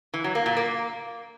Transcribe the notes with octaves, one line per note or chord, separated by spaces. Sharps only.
E3
F#3
A#3
A#2
A#3